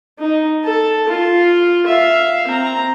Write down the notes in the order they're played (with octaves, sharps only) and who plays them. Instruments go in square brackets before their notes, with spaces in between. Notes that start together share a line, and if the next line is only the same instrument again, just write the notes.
[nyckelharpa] D#4
A4 A5
F4
E5 F5
C4 A#5